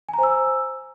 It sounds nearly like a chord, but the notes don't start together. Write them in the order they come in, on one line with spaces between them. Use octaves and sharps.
G#5 A#5 C5 E6